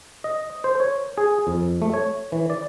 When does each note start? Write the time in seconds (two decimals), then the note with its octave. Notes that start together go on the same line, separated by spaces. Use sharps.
0.24 D#5
0.64 C5
0.80 C#5
1.18 G#4
1.47 F2
1.82 A3
1.94 C#5
2.32 E3
2.50 D5